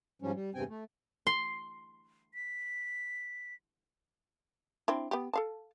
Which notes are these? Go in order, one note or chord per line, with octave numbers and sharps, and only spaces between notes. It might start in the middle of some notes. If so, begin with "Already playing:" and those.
G#2 F3 G3 C#4
G3
E2 G2 C3 C4 G5 G#5
A3
C6
B6
C4 D4 E4
B3 G4
A4 F5 A5